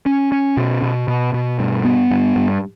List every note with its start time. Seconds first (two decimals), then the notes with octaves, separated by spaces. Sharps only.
0.06 C#4
0.32 C#4
0.57 B2
0.82 B2
1.08 B2
1.34 B2
1.59 G2
1.85 B3
2.11 G2
2.36 G2